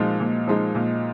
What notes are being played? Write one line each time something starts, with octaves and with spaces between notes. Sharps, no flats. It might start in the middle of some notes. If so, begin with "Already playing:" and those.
Already playing: A#2 F3 G#3 D#4
A#2
F3 G#3 D#4
A#2